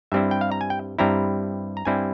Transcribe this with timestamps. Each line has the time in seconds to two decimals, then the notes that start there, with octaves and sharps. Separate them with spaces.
0.12 G2 G3 C4 E4 E5
0.31 G5
0.41 F5
0.52 A#5
0.61 G#5
0.70 G5
0.99 G2 G3 C4 E4 A#5
1.77 A#5
1.85 G2 G3 C4 E4 G#5